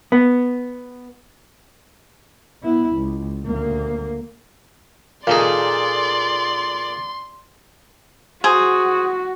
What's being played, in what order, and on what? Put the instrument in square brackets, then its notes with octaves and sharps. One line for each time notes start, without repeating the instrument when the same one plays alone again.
[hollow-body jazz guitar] B3
[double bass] B3 E4
C#2
D2 A#3
[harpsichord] A#2 D#4 [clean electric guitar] G#4 A4 F5 [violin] D5 [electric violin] C6
[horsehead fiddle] F#4 [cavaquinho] G#4 C5